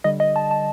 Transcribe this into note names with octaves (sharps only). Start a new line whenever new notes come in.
D3 G3 D#5
D#5
A5
A5